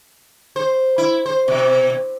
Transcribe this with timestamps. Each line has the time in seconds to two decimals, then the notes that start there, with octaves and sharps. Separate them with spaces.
0.56 C5
0.98 E4
1.26 C5
1.48 B2